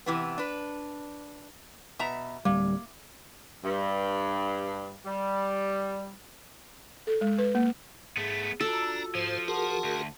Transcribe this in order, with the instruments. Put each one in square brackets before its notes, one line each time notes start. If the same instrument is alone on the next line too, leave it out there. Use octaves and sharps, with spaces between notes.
[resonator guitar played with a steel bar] C3 E3 B3
D4 B4
B2 E5 A#5
[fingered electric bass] D1 G3 [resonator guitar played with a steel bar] A#3
[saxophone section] G2
G3
[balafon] A4
G#3
B4
A#3
[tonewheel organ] G#2 [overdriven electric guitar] A3 B3 [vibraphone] G#4
[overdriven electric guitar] D4 [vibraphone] F4 F#4 [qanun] A4 [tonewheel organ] A#5
[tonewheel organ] G#2 C5 [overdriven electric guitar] F3
[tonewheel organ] F#4 G#4 A#4 [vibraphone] F#5 A5 C6
[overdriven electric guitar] D2